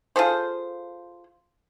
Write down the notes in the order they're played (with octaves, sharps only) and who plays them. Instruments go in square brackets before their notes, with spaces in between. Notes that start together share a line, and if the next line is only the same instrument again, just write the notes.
[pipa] F4 G#4 A4 C5